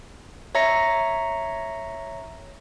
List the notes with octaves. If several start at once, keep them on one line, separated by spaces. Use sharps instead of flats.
C#5 E5 A#5 A#6 C#7